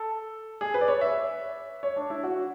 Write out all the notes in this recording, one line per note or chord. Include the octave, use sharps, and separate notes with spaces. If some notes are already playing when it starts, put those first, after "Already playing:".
Already playing: A4
G#4
B4
D5
C#5
E5
C#5
D4
E4
F#4